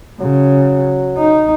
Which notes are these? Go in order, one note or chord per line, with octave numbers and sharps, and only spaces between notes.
C#3 F#3
D#4